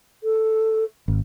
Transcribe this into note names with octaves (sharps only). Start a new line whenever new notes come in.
A4
G#1